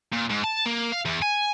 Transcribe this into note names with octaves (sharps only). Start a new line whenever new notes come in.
A#2
G#2
A5
A#3
F5
E2
G#5